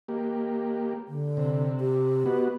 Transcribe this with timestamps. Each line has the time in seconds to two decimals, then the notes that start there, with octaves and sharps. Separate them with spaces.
0.09 A#3 G4
1.08 D3
1.37 C3
1.80 G4
2.26 B3 F#4